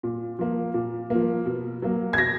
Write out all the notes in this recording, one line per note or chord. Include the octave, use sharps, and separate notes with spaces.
A#2
F3 A#3
A#2
F3 A#3
B2
F#3 A#3
G#6
B2 A#6